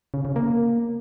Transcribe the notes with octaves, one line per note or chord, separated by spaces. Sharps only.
C#3
C#3
A#3